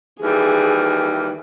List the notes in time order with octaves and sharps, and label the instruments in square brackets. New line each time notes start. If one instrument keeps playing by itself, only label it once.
[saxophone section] D#2 E3 G3 [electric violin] G#4